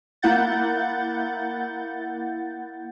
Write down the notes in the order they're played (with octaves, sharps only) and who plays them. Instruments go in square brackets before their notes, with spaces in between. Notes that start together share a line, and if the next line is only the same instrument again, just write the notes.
[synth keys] A#3 E4 F#5 G6 A6